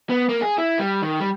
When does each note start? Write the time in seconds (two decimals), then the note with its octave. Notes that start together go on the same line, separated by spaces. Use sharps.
0.10 B3
0.29 A#3
0.42 G#4
0.58 E4
0.79 G3
1.02 D#3
1.20 G3